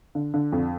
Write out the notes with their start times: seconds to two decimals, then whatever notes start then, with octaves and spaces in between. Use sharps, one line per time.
0.15 D3
0.34 D3
0.52 F2